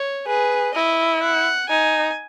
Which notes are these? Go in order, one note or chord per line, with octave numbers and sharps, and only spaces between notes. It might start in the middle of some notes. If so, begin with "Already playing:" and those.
Already playing: C#5
G#4 B4
E4 D#5
F#5
D#4 G#5